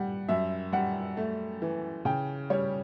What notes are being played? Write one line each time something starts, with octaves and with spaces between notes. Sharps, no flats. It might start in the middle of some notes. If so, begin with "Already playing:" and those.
Already playing: G3 F#5
F#2 E5
G3 F#5
A3
E3
C#3 G5
G3 C#5